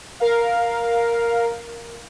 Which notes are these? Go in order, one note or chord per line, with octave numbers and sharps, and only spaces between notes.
A#4 F5